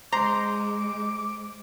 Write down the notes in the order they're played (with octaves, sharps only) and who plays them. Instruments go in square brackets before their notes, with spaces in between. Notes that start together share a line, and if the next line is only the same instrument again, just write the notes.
[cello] G#3 [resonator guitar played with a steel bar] C5 [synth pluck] A#5 [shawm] D6